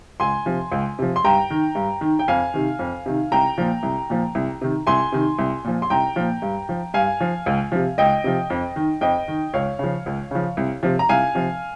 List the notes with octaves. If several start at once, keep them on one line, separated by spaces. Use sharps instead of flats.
C#2 G#5 C6
C3 F3
C#2
C3 F3
C6
G2 G5 A#5
D#3
G2
D#3
G5
F2 F5 G#5
C3 D#3
F2
C3 D#3
C2 G5 A#5
A#2 F3
C2
A#2 F3
C2
C3 D#3
C2 G#5 C6
C3 D#3
C2
A#2 F3
C6
C2 G5 A#5
A#2 F3
G2
F3
G2 F5 G#5
F3
C#2
C3 F3
C#2 D#5 G5
C3 F3
F2
D#3
F2 D#5 G5
D#3
C#2 C#5 F5
C#3 F3
C#2
C#3 F3
C2
C3 F3
A#5
C2 F5 G#5
C3 F3